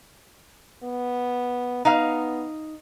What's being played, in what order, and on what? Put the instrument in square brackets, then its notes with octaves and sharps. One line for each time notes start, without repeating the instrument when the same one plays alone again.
[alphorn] B3
[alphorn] B3 [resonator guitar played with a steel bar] D#4 F5